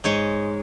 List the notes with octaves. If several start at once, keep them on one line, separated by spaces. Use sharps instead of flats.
G#2 G#3 C#5